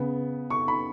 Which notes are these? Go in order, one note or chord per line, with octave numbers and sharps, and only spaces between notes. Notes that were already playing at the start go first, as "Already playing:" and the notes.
Already playing: C#3 B3
C#6
B5